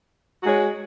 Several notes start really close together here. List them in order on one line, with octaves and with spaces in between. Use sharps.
F#4 G#3 C#5